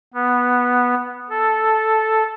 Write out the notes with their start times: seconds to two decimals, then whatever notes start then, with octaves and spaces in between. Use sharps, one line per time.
0.14 B3
1.30 A4